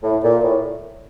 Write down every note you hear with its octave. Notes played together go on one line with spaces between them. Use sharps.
A2
A#2
A2